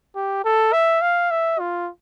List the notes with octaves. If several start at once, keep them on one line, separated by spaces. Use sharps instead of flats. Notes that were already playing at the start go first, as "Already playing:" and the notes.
G4
A4
E5
F5
E5
F4